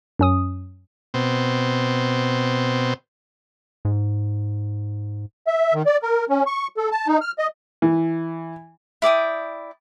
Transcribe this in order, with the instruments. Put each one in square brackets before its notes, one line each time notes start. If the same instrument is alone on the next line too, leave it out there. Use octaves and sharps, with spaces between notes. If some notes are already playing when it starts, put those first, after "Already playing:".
[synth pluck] F#2 C#4 D#6
[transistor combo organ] B2 C4
[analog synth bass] G#2
[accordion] E5
D#3
D5
A#4
C#4
C#6
A4
A5
D#4
F6
D#5
[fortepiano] E3
[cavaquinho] E4 D5 G5 D#6